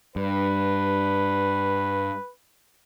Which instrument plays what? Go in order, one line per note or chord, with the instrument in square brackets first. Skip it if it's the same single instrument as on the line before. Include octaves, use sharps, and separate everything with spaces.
[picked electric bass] G2 [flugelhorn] B4